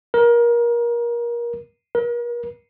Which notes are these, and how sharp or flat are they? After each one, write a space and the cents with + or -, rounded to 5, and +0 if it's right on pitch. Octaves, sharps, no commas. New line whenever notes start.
A#4 +25
A#4 +40